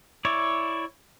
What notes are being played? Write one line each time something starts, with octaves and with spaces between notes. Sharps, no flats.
E4 C#5 D5